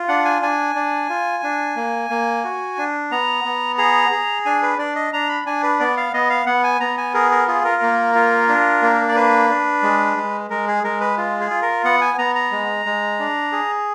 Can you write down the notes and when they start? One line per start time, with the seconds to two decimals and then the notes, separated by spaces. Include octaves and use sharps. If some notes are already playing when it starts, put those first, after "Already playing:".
Already playing: F4
0.08 D4 F#5
0.25 G#5
0.42 D4 G#5
0.75 D4
1.09 F4
1.43 D4
1.76 A#3
2.10 A#3
2.44 F#4
2.78 D4
3.11 B3 A#5
3.44 B3
3.78 G#4 A#5
4.12 G#4
4.45 D4 G#5
4.62 B4
4.78 D4 D5
4.95 D#5
5.13 D4 A#5
5.29 B5
5.46 D4 G#5
5.63 B4
5.80 B3 D5
5.97 F5
6.13 B3 D#5
6.30 F5
6.46 B3 F#5
6.63 G#5
6.81 B3 A#5
6.98 G#5
7.14 G#4 A#4
7.31 A#4
7.48 F4 G#4
7.65 A#4
7.82 A#3
8.15 F4
8.49 D4
8.82 A#3
9.09 D5
9.15 D4 B4
9.50 D4
9.83 G#3
10.17 G#3
10.50 G#3 A#4
10.68 G#4
10.84 G#3 A#4
11.01 B4
11.18 F4
11.40 G#4
11.50 F4
11.62 A#4
11.84 B3 F#5
12.01 G#5
12.18 B3 A#5
12.35 A#5
12.51 G#3
12.86 G#3
13.20 D4
13.52 G#4